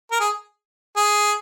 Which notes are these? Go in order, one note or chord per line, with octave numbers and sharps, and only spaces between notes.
A#4
G#4
G#4